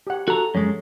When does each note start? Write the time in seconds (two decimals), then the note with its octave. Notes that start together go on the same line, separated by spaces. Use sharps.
0.07 G4 F#5
0.28 F#4 A4 A#5
0.55 F#2 G#3 C#5